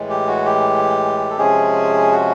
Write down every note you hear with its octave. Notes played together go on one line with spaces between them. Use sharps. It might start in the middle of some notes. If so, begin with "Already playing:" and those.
Already playing: A2 E3 G#3
G4
F#4
G4
A4
C3 F3 G#3 C#4 G#4
F#4